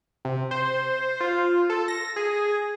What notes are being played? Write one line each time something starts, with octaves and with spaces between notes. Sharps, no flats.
C3
C5
F4
A4
A#6
G#4